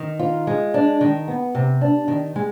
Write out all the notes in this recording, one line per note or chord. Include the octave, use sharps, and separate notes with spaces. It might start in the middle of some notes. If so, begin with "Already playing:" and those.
Already playing: D#3
F4
G#3
D4
D#3
B3
C3
D4
D#3
G#3